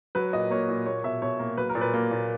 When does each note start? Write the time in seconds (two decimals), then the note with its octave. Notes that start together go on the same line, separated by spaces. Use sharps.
0.15 F#3 B4
0.33 A#2 D#5
0.50 A#3 C#5
0.68 A#2
0.86 A#3 C#5
1.04 B2 E5
1.22 B2 C#5
1.39 A#3
1.57 F#3 B4
1.69 A#4
1.75 A#2
1.81 B4
1.94 A#3
2.11 A#2